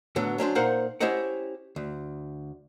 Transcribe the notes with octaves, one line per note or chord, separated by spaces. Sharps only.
A2 D3 F#3 B3
F#3 C#4 D4 C5
A#2 D#4 A#4 C5 F5 F#5
C#4 E4 G4 C5 D#5 F#5
D2